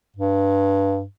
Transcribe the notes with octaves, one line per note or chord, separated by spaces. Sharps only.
G2